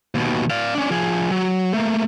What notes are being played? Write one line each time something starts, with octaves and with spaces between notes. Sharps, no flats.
D#2 B2
D5 F5
C#4 D4
F3 G#4
F#3
A3 A#3